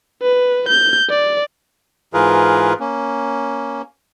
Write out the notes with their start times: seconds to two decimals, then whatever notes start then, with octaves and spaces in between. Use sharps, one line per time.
0.22 B4
0.69 G6
1.09 D5
2.14 G#2 E3 F4 G#4 A#4 B4
2.80 A#3 C#4